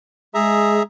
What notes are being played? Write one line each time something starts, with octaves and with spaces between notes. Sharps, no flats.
G#3 G#4 E5 A#5